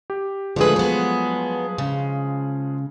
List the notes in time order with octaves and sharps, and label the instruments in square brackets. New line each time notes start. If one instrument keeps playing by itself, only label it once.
[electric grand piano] G4
[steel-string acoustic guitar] D3 A3 B4 [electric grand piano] F3 G#3 G#4
[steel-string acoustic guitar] F#3 B3
C#3